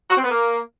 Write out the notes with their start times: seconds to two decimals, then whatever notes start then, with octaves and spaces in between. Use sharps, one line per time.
0.09 F#4
0.16 C4
0.23 B3
0.30 A#3